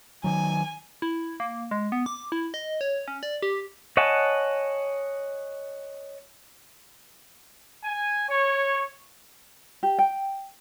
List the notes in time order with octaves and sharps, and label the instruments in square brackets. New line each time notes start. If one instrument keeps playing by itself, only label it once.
[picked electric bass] D#3 F#3 [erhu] G#5
[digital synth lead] E4
A#3
G#3
B3
D6
E4
D#5
C#5
C#4
D5
G4
[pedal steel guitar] C#5 D#5 F#5 G#5 A5
[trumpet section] G#5
C#5
[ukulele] G4
G5